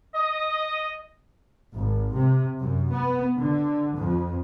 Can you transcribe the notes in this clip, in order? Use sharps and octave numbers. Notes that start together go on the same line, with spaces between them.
D#5
G#1
C3
F#2
B3
D3
F2